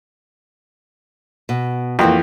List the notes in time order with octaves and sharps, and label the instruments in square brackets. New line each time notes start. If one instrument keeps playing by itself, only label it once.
[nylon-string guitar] B2
[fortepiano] F2 E3 [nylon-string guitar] A#3 C4 F#4